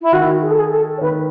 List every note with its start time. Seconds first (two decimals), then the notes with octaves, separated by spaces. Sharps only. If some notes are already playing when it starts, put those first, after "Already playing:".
0.01 E4
0.12 D#3 F#4
0.41 G#4
0.50 A4
0.58 G#4
0.71 A4
0.97 C#5
1.01 D#3 B4